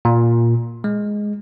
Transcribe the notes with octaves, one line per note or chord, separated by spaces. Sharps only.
A#2
G#3